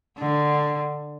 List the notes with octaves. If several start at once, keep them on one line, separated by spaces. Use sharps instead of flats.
D3